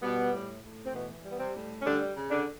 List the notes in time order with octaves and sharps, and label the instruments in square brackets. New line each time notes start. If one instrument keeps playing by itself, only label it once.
[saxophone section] B2 G3 B3
A2
A2
C4
B2 E3 B3
G3
B3
C3 C4
A2
C#4
D3 G3 D4
C#3
D3 D4